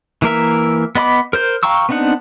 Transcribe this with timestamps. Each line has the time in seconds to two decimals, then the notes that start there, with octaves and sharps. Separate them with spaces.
0.22 E3 A#3 A#4 E5
0.95 B3 D#5 B5 D6
1.33 A#4 C5 G6
1.63 F5 G5 A#5 C#6 E6
1.89 B3 C4 D4 D#4 F#5